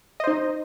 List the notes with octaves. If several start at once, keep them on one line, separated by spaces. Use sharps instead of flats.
D#4 C5 D#5